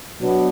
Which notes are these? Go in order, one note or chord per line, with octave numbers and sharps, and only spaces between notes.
B2 F#3 B3 D4